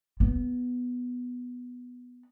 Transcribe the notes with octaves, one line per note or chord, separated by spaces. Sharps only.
B3